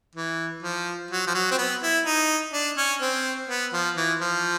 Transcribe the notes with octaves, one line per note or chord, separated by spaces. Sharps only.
E3
F3
F#3
F3
F#3
C4
B3
E4
D#4
D4
C#4
C4
B3
F3
E3
F3